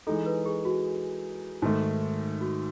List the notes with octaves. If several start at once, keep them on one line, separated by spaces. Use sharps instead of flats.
E3 G#3 D#4 A4
B4
G#4
F#4
G#2 D#3 A3
F#4